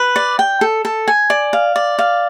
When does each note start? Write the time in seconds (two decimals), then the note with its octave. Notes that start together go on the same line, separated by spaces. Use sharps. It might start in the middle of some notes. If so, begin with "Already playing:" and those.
Already playing: B4
0.16 D5
0.39 G5
0.61 A4
0.85 A4
1.08 G#5
1.30 D5
1.53 F5
1.76 D5
1.99 F5